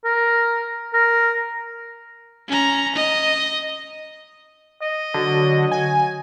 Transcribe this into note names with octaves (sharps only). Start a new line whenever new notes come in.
A#4
A#4
C#4 A#5
D#5
D#5
D3 F#3 F#4
G#5